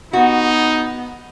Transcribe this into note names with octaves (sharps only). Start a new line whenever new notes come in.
B3 D#4 F#4